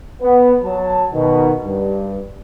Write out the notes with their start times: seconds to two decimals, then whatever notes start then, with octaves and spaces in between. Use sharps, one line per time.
0.22 B3
0.64 F#3 A5
1.12 B2 D#3
1.64 G2